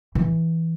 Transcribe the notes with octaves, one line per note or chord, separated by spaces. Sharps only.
E3